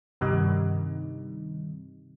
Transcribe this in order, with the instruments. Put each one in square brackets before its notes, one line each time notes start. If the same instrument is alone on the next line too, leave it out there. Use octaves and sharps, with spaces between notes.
[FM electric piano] G2 C3 D#3 G3 D#4